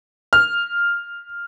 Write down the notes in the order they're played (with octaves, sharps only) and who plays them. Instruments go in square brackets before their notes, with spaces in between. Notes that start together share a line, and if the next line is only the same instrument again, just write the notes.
[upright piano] F6